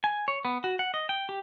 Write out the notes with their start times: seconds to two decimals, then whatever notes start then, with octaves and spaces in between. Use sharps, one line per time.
0.04 G#5
0.28 C#5
0.45 B3
0.64 F#4
0.79 F#5
0.94 D#5
1.09 G5
1.29 G4